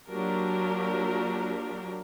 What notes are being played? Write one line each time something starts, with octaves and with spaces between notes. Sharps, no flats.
F#3 A#3 D4 F4 G4 A#4